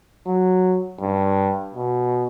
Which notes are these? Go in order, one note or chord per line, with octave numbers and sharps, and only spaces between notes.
F#3
G2
B2